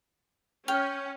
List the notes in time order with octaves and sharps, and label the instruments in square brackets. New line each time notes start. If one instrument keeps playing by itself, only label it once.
[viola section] C#4 [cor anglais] C#5 [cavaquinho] G5 [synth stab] F6